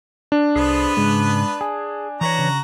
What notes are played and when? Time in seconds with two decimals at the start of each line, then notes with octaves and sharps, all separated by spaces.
0.32 D4
0.56 C2 B3 G#4 A4 B4 C5
0.97 G#2 C#3 G#3
1.61 G#4 G#5
2.21 E3 F#4 B4 C#5 A#5
2.39 C#3